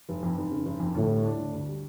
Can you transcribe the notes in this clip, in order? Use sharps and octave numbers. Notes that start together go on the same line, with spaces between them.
F1
F2
F1
C#3
F1
F2
D2 A2
G3
D4
D3
D2
G3